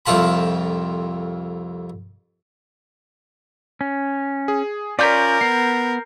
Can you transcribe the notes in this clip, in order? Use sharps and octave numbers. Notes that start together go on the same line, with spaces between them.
C2 F2 A3 F4 A5 B5
C#4
G#4
C#4 F4 A#4 D5 G6 B6
B3 C7